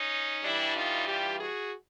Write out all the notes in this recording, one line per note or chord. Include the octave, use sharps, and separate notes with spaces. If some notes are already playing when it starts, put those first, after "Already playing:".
Already playing: C#4 D#4
G2 E3 G3 D4 E4
D#4 F4
F4 G4
F#4 G#4